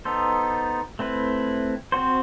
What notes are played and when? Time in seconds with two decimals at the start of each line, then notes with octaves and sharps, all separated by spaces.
0.05 B3 D#4 A4 C5
0.99 A3 C4 E4 B4
1.92 C4 F#4 C5